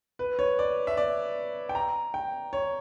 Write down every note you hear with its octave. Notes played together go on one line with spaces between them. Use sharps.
B4
C#5
D5
E5
D5
G5
A#5
G5
C#5